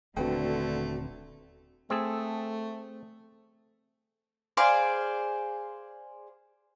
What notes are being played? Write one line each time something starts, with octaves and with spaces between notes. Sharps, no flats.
D#1 D3 A3 C4 F#4 B4 G5
A3 C4 G#4 A4
G#4 C5 D5 F5